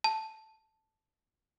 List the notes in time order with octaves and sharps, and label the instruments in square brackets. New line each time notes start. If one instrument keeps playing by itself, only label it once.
[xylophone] A5